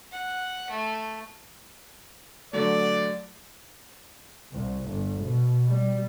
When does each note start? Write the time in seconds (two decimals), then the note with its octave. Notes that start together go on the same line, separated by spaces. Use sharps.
0.12 F#5
0.70 A3
2.53 D3 F#3 A3 D5
4.56 C2
4.89 G1
5.23 B2
5.69 G3